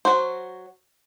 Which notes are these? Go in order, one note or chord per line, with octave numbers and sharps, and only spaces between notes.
F#3 F#4 C5